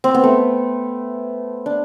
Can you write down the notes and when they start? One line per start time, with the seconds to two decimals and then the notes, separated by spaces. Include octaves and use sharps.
0.04 C4
0.14 B3
0.24 A3
1.66 D4